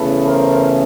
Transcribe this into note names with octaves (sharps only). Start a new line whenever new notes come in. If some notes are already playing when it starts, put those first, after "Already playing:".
Already playing: E2 C#3 E3 A3 A4 B4
A#4 C5